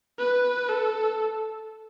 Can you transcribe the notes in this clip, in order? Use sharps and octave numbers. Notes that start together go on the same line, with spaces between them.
B4
A4